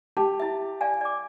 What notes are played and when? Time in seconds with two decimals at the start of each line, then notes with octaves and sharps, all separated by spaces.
0.17 G4 A5
0.40 E4 E5
0.81 D5 F5 G#5
1.01 D5 D6